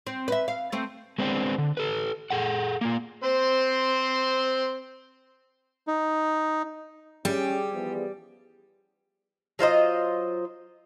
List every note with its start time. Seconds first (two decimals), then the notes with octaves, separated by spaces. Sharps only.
0.07 C4
0.28 B4 E5
0.48 F5
0.72 A3 C4
1.18 G#3 B3 C4 D4
1.58 D3
1.77 A4 B4
2.30 G#4 A4 F#5
2.81 A#3 F4
3.23 C4 C5 C6
5.87 D#4
7.25 G3 C#4 G4 G#4 D5
7.72 E3 F3 B3
9.59 F#3 F4 C5 D#5